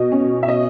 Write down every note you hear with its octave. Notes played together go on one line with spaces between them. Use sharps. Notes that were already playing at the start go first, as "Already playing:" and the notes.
Already playing: B2 D#5
C#4
E5
D#5